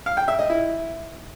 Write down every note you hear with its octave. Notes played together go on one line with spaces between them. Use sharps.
F5
G5
E5
D#5
E4